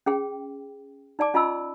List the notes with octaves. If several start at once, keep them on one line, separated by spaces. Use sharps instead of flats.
C#4 G#4 G5
D#4 D5 A5 D6
C#4 F4 D#5 A5 B5 E6